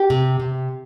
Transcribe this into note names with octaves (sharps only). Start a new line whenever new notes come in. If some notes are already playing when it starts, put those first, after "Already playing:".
Already playing: G4
C3
C3